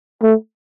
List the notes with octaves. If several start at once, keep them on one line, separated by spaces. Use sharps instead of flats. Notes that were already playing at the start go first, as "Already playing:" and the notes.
A3